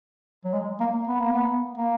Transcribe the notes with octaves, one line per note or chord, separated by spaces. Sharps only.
F#3
G#3
A#3
B3
A#3
B3
A#3